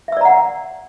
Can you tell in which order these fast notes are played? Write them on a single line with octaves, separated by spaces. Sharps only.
E5 E6 D5 A#5 F#5